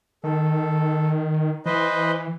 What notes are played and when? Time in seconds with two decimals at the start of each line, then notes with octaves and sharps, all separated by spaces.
0.24 D#3 A4
1.66 E3 B4 C5 D#5